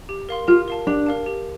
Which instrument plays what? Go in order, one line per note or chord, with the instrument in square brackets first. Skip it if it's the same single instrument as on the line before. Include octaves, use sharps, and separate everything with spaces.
[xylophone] G4
A#4 F5 C6
[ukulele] F4 [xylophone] G4
[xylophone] A#4 F5 A5
[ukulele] D4 [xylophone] G4
[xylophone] A#4 F5 A5
G4